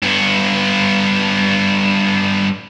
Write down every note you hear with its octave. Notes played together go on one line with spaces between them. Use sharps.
G2 B3